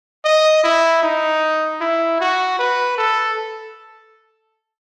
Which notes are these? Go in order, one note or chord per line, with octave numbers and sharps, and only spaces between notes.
D#5
E4
D#4
E4
F#4
B4
A4